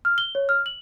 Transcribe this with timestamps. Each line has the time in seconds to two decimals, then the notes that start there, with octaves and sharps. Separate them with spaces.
0.05 F6
0.18 G7
0.35 C#5
0.49 F6
0.66 F#7